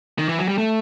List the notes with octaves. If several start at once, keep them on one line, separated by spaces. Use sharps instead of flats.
D#3
E3
F#3
G3
A3